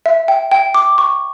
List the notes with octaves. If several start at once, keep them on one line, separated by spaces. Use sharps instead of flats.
E5
G5
G5
D6
C#6